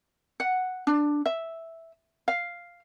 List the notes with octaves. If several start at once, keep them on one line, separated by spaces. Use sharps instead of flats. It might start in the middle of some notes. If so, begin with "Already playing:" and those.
F#5
D4
E5
F5